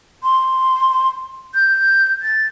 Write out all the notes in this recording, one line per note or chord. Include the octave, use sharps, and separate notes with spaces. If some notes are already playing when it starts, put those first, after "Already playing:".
C6
G6
A6